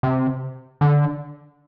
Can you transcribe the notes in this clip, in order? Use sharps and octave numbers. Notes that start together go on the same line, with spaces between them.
C3
D3